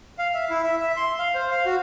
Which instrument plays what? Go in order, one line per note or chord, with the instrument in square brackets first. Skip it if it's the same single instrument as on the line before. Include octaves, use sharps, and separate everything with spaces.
[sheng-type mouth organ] F5
E5
E4
E5
E5
C6
F5
C5
F5
F#4